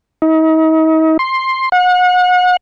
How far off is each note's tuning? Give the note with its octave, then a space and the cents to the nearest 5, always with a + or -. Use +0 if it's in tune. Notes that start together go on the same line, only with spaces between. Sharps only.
D#4 +40
C6 +10
F#5 -35